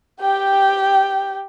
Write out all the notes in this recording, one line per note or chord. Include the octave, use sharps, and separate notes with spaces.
G4 G5